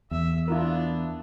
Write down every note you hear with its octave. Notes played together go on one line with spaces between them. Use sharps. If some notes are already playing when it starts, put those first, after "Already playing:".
E2 E5
B3 D4 E4 F4 A#4